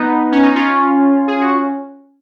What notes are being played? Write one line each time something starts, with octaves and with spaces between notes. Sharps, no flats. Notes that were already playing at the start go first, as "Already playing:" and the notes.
Already playing: B3 D#4
C#4
D#4
C#4 F4
G#4
F#4